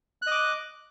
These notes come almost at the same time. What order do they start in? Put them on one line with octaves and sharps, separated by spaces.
F#6 D#5 D6